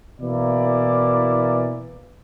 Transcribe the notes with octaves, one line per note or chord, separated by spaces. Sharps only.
B2 E3 A#3 E4 D5